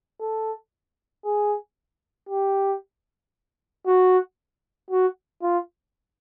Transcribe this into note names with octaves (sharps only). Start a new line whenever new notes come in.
A4
G#4
G4
F#4
F#4
F4